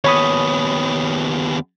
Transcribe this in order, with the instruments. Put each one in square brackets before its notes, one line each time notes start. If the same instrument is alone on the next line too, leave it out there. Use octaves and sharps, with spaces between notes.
[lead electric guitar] D#2 B3 [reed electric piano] C#5 B5 D#6